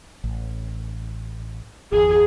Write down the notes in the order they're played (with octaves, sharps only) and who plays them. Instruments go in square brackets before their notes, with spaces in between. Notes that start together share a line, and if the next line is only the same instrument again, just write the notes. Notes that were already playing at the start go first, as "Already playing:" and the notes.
[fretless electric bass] A1
[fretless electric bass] G1 E2 [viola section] G#4